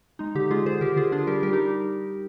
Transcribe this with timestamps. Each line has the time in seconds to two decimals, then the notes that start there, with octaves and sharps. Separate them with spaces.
0.19 G#3 D#4
0.35 D3 D#4 G4
0.51 G#3 F4 G#4
0.65 D3 G#4 C5
0.81 D3 G4 A#4
0.96 D3 F4 G#4
1.12 D4 F4 G#4
1.27 G3 G4 A#4
1.43 G3 G4 A#4
1.53 D#4 G4